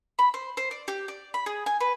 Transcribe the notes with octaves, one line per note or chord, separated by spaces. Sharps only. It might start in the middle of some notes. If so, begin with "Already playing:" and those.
B5
C5
C5
D5
G4
D5
B5
G#4
G#5
B4